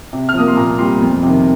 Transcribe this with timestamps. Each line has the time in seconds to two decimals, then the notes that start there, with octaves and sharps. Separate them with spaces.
0.13 C3
0.29 F6
0.34 F3 A#3 D#6
0.48 C6
0.57 A#2 A#5
0.79 G3 C4 C6
1.01 F2
1.23 C3 D#3